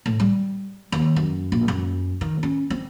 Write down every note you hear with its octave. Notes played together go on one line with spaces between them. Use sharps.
A2
G3
D#2
F#2
A#1
F#2
D#3
C#4
C4